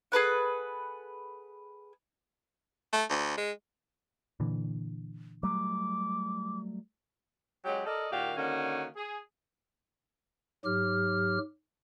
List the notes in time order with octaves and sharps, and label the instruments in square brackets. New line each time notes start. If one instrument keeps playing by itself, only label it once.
[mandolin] G#4 A4 B4 F#5
[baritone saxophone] A3
D2
G#3
[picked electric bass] A#2 D3 E3
[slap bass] F#3 G3 A3 [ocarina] D6
[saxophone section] F#3 G#3 C#4 G4
A4 A#4 D5 D#5
A#2 D#3 F#4 G4 F5
D3 D#3 A#3 C#4 F#4
G#4
[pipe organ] G#2 F#3 G4 F6